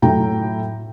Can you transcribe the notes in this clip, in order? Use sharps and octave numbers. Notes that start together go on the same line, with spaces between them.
A2 F#3 G5 A#5